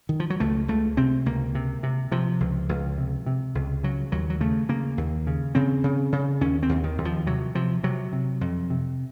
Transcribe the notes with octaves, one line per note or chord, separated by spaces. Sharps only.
D#3
F3
F#3
C#2 A3
C#2 A3
C3 C4
C#2 A#3
C3
C3
C3 F3
C#2
C#2
C3
C3
C#2
C#3 F#3
D#2 F#3
F#3
C#3 A3
C#3 A#3
D#2
C#3
C#3 C4
C#3
C#3
D#2 C#4
C4
D#2
D#3
D#2
F3
C3 F#3
C3 F3
C3 F#3
C3
F2
C3